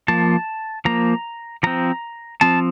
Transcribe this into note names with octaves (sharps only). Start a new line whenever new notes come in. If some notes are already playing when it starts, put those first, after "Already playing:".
F3 A#3 A5
F3 A#3 A#5
F3 C4 A#5
F3 C4 A5